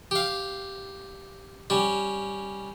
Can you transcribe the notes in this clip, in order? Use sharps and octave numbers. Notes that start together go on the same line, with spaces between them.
G4 F5
G3 C#4